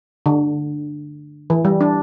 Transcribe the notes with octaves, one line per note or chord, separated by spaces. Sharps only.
D3
E3
G3
D4